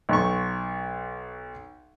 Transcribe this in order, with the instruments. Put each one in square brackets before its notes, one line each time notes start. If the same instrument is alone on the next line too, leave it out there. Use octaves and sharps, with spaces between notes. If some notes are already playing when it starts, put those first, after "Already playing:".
[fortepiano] B1 C#6